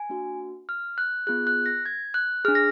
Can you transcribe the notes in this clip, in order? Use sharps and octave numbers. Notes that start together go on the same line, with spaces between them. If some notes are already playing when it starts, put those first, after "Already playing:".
Already playing: G#5
A#3 D4 F#4
F6
F#6
B3 F4 G#4 F#6
F#6
A#6
G#6
F#6
D4 G#4 F6
A#6